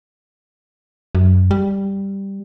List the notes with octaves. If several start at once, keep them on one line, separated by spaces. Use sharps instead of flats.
F#2
G3